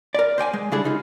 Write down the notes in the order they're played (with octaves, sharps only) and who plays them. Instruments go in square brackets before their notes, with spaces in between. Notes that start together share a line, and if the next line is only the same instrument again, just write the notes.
[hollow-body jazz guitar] A#4 D5
C5 D5 G5 G#5
G#3
C#3 G3 D4 E4 G#4 A4
C#3 D#4 F4